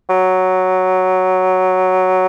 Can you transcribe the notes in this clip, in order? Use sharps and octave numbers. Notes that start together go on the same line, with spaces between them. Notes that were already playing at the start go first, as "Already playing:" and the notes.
F#3